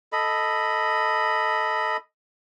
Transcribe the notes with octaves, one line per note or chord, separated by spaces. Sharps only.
A4 D#5 B5